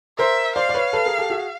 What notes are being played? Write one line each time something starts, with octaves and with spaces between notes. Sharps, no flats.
A#4 C5 E5
C5 D5 F5
D5
B4 C#5
A4 B4
G#4 A#4
G4 A4
F#4 G#4